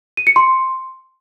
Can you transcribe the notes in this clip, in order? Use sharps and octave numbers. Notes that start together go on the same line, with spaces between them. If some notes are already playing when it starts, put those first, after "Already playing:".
D#7
C#7
C6